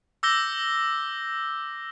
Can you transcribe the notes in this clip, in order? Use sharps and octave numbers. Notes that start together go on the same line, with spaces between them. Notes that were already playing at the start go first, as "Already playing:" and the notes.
D6 E6 G6 A#6 G7